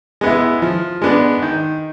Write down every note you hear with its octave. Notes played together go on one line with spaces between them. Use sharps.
G#3 B3 E4
F3
G#3 B3 D4
D#3